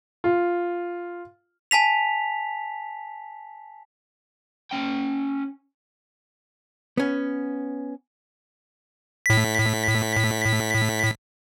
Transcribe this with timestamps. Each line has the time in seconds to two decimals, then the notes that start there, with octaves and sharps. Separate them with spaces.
0.24 F4
1.71 G#5 A5 B6 F7
4.72 C#4 G5
6.97 B3 C#4
9.26 A2 B6